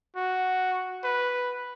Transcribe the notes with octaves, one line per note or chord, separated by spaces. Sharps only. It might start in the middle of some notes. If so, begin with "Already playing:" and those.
F#4
B4